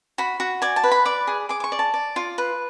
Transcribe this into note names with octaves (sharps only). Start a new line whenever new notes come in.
F#4 B5
F#4
D5 G#5
A5
B4
B5
D5 D6
G#4
G#4 D6
D6
C#6
D5
A5
D5
F4
B4